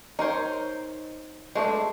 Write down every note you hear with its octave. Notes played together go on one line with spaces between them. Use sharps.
D#4 A#4 C5 C#5
G#3 A3 D4 A4 D5